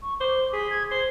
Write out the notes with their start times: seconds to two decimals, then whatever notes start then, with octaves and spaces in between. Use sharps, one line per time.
0.02 C#6
0.20 C5 D6
0.53 G#4 B6
0.70 G#6
0.91 C5 C7